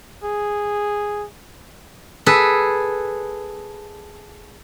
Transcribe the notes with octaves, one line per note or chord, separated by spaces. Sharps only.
G#4
G#4 A4 B4